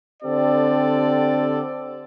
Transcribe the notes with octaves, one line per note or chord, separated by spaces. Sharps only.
D3 C4 G4 A4 D5